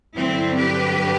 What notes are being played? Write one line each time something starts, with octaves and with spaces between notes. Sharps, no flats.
G2 D3 F#3 C4 E4
G4 B4